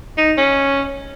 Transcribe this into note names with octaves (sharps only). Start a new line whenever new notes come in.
D#4
C#4